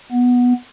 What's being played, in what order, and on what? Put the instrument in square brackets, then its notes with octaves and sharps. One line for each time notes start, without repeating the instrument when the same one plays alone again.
[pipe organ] B3